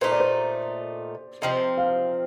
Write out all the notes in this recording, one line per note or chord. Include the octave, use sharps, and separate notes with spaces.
A#2 A3 D#4 C5
D5
C5
C3 F3 C4 D#5
F5